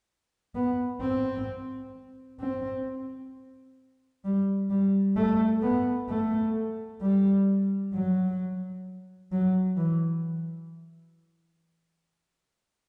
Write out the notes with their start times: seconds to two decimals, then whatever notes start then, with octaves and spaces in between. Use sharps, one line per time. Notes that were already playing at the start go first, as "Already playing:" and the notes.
0.55 B3
1.01 C4
2.40 C4
4.24 G3
4.70 G3
5.16 A3
5.62 B3
6.09 A3
7.01 G3
7.93 F#3
9.32 F#3
9.77 E3